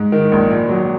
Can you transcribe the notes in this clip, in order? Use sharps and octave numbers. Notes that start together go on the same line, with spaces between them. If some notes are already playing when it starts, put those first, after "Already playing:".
Already playing: G#2
D#3
A#1
A#2
F#3